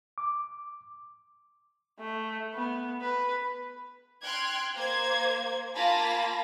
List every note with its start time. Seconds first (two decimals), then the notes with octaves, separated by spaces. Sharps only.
0.18 D6
2.00 A3
2.54 B3
3.02 B4
4.23 G5 C6 F6 F#6 G#6
4.75 A#3 C5 G#6
5.75 A#3 F4 G#5 A5 B5 A#6